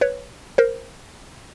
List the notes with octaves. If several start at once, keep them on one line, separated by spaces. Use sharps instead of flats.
B4 C#5
A#4 C5